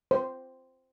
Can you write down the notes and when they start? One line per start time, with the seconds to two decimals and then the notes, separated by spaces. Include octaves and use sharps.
0.11 C5